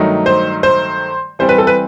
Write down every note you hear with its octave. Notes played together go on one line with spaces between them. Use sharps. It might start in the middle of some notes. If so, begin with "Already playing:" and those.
Already playing: G2 D#3 F#3 A3 D#4
C5
C5
E3 G3 C4 C5
B4
A4
B4